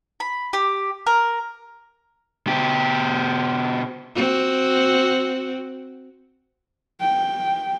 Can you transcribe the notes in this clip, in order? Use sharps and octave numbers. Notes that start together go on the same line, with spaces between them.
B5
G4
A#4
B2 G4
C4 F#4
G5